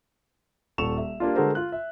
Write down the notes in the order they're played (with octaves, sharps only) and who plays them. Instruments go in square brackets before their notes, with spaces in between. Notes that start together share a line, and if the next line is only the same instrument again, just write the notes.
[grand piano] D#1 A4 C#6 E7 F7
E5
G3 A#3 D4 F4
D3 G#3 F#4 A4 A#4 C5
F4 F#6
E5